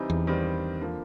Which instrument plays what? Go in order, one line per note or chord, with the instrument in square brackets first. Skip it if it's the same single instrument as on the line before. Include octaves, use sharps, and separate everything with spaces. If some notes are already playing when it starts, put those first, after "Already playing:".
Already playing: [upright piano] C3 E3 G3 C4 D#4
[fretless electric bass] E2
[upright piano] G2 D#3 G3 C4
D3 F3 A#3